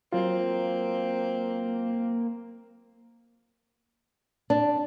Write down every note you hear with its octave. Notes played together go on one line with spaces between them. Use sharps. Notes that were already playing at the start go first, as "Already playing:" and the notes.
F#3 A#3 C4 F4
D4